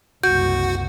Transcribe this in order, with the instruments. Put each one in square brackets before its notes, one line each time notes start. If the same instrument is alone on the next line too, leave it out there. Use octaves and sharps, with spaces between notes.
[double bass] F#1 C2 [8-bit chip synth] F#4 [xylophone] G6